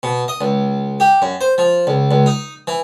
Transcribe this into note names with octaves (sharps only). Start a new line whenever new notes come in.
B2
D#5
C#2
G4
F#2
C5
F3
C#2
C#2
D#4
E3